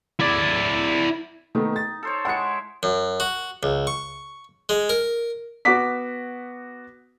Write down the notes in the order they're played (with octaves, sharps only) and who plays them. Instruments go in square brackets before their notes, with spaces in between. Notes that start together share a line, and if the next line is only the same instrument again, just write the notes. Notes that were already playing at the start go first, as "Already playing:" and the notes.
[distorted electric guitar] E4 D5
[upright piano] D#3 A3 B3 [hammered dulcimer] D#4
[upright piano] A6
[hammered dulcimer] A4 C5 C#5
[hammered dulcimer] G#3 E4 [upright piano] F#5 C#7
[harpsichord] F#2
F#4
C#2
C#6
G#3
A#4
[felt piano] B3 F#4 D6 B6